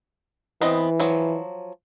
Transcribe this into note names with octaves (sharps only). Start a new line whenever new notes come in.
E3 B3 C4 D#5
F3 F#3